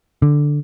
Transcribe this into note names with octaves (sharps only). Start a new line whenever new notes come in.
D3